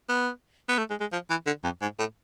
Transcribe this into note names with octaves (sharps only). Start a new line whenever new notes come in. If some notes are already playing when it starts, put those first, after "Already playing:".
B3
B3
A3
G#3
G#3
F3
E3
D3
F2
G#2
A2